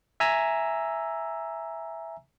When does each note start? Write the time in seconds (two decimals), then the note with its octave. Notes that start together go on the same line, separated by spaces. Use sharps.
0.20 E5 G#5 A#5 E6